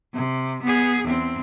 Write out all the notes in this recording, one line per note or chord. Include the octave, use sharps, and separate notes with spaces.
C3
B3 G#4
E2 C4